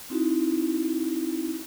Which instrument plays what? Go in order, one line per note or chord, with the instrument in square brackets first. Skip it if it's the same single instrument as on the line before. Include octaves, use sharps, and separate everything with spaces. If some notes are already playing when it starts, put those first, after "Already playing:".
[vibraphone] C4 D#4 E4 F#4